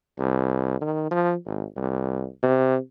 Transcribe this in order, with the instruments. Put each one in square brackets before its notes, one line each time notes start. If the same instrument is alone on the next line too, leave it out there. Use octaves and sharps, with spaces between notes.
[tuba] C2
D#3
F3
G#1
C2
C3